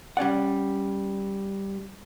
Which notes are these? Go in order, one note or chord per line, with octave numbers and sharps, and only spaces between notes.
G3 C#4 D5 F#5